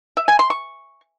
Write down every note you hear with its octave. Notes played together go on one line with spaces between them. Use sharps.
E5
G#5
C6
C#6